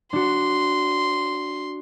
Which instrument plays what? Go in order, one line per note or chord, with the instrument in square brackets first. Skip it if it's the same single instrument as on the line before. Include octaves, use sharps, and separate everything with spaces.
[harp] D4 F#4 [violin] C6